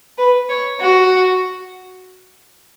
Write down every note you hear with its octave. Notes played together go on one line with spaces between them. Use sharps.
B4
C#5
F#4